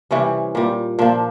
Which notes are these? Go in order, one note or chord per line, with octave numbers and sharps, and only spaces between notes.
C3 E3 G3 C#4
A#2 G3
A#2 F3 D4